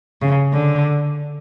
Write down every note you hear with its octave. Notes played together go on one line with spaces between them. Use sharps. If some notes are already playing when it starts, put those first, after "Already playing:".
C#3
D3